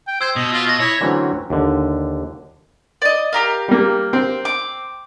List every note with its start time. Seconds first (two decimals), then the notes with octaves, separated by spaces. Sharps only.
0.08 G5
0.21 C5 E6 G#6
0.36 B2 D#5
0.53 F4
0.67 D#5 G#6 A#6
0.80 E4 C#5
1.01 D3 E3 F#3 A3 C4 C#4
1.50 D#2 D3
3.02 D5 D#5
3.33 G4 A#4 F5
3.68 G3 A#3
4.13 C4
4.45 D6